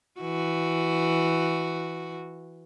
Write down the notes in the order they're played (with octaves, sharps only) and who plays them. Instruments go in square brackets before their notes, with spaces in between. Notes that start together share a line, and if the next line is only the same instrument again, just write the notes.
[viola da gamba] E3 F#4